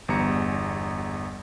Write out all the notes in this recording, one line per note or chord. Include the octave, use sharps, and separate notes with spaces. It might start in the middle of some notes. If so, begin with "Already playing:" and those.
G1 E2 G3 A#5 C#7